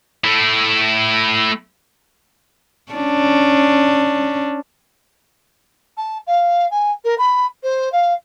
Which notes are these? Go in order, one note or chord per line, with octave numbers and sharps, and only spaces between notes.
A3 E4
C#4 D4
A5
F5
G#5
A#4
B5
C5
F5